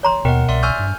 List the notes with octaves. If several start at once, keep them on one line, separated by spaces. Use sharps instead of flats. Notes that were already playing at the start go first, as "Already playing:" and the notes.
C#5 A#5 C6
D#2 B2 A#4 D#5 F#5 G5
C2 D5 E5 C6
G#5 C#6 E6 F6 G6
G2